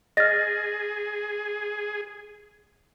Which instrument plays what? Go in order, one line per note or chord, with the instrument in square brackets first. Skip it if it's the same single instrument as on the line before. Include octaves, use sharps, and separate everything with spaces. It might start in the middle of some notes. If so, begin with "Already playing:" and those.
[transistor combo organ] G#4 [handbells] D#5 F6 [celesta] A6 A#6